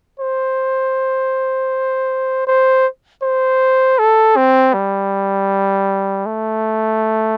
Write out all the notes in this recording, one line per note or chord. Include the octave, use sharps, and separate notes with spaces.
C5
C5
C5
A4
C4
G3
A3